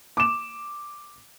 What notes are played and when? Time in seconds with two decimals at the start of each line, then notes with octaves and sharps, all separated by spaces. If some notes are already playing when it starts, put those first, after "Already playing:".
0.17 D6 E7